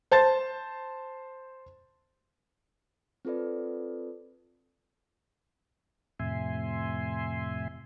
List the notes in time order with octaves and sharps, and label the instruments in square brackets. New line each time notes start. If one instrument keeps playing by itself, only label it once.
[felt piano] C5 A5 C6 A6
[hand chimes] C4 F4 A4 B4 D5
[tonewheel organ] F2 A2 C3 E5 G#5 C6